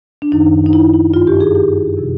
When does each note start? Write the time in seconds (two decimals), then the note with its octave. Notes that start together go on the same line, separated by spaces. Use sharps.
0.22 D4
0.32 F#2 D#3 D#4
0.66 D#4
0.73 E4
0.94 E4
1.14 G2 D#3 F4
1.27 G4
1.40 G#4
1.55 G4
1.97 C3 F3